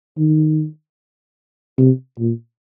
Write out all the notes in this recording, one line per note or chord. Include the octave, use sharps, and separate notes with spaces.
D#3
C3
A#2